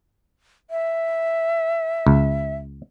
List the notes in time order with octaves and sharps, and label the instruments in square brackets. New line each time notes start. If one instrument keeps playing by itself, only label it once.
[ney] E5
[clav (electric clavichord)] C#2